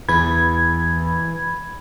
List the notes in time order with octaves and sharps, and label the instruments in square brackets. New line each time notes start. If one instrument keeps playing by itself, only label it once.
[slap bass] E2 [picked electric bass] E3 [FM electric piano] B5 G#6